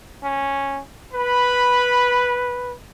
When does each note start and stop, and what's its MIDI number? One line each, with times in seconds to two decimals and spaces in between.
0.23 0.80 61
1.13 2.73 71
1.13 2.46 83